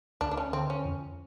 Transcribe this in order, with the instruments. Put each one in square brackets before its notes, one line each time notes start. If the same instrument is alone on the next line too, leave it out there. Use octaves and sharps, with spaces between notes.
[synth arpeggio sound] D2 [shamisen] D4
[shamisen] D4
C#4
[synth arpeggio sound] D3 [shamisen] C4
[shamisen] C#4
[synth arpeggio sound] F2